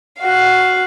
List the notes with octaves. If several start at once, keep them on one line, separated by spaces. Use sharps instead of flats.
F#4 F5